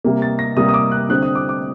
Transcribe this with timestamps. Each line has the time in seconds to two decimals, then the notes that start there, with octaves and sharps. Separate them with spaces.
0.04 C3 G3 A#3
0.22 A6
0.39 A#6
0.56 C3 G3 A#3 D#6
0.69 D#6
0.74 D6
0.91 F#6
1.09 D3 G3 C4 F#6
1.22 D#6
1.35 D6
1.49 D6